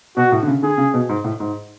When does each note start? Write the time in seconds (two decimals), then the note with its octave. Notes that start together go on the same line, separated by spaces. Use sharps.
0.17 B2 F#4
0.32 A2
0.43 D3
0.47 C#3
0.63 D3 G#4
0.78 C#3
0.94 B2
1.09 G#2
1.24 A2
1.40 G#2